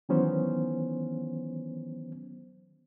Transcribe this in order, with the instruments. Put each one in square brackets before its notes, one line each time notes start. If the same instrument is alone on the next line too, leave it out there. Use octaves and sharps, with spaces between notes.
[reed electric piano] D#3 E3 F#3 B3 C#4 C5